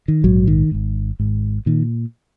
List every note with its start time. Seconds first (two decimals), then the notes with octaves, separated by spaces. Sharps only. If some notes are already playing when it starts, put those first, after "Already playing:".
0.08 D#3
0.24 A#1 G#2 F#3
0.47 D#3
0.71 G#1 G#2
1.19 G#1 G#2
1.66 A#2 D#3